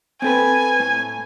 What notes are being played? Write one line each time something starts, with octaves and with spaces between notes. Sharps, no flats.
C4 A4 B4 G#5
A2